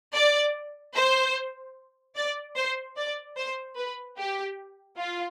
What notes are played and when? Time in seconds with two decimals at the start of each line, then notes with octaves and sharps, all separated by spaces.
0.14 D5
0.95 C5
2.16 D5
2.56 C5
2.96 D5
3.37 C5
3.77 B4
4.17 G4
4.98 F4